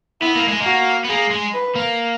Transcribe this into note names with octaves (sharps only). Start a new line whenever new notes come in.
B3 E4
A#3
G#3
A#3 F#4
B3
A#3 G#4
G#3
B4
A#3